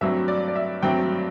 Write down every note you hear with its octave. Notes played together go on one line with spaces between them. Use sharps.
G2 F#3 A3 C4 E5
D5
D5
E5
G2 F#3 A3 C4 G5